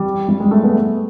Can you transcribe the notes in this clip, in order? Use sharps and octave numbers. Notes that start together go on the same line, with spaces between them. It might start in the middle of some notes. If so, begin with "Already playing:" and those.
Already playing: G3
G3
G#3
A3
B3